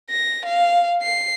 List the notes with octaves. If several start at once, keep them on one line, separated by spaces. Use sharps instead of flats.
A#6
F5
C7